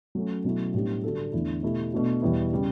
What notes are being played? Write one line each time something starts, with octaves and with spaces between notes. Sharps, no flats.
F#3 A3 C#4
B2 F#3 A3 C#4 E4
A2 G3 B3 D4 G4
D3 G3 D4 F#4 A4
E2 D3 A3 E4
B2 A3 E4 G4
B2 A3 D4 F#4
E2 B2 G3 B3 E4
C#3 G3